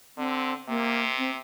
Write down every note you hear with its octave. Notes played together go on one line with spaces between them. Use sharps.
D3 C4
C3 A#3
C4